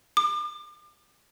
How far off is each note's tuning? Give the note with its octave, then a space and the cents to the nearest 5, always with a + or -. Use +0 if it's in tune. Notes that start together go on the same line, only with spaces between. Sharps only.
D6 +40